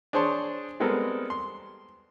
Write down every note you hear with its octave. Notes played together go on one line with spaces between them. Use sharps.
D4 G#4 C5 C#5 A5 C6
G3 G#3 B3 C4 A4 A#4
C6